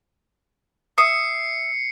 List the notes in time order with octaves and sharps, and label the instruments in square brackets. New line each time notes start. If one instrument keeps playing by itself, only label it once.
[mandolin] E5 D#6 [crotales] C7 C#7